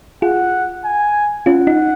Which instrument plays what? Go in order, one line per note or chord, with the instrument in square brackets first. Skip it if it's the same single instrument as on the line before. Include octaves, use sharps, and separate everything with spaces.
[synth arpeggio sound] F4 G#4 [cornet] F#5
[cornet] G#5
[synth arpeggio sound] C#4 F4 [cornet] F#5
[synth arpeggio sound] D#4